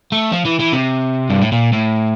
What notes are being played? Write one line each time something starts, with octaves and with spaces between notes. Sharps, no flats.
A3
F3
E3
E3
C3
G2
A2
A#2
A2